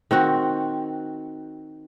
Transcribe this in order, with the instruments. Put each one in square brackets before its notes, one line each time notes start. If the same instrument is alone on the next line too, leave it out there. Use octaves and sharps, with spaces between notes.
[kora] D#3 C4 F#4